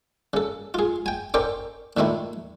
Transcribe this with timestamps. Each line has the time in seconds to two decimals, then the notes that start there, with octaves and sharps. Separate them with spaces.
0.34 C#3 A4
0.74 F4 G#4
1.06 G5 G#5
1.34 C#4 A4 A#4 C5 D5 G5
1.97 A#2 D#3 A3 C4 E4